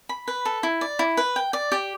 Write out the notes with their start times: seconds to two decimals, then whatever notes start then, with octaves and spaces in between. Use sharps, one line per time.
0.09 B5
0.28 B4
0.45 A4
0.63 E4
0.81 D5
0.99 E4
1.17 B4
1.36 G5
1.53 D5
1.72 G4